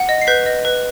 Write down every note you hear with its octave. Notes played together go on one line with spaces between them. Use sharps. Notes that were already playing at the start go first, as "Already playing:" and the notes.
Already playing: F#5
D#5
C7
B4 G6 B6
D#5
B4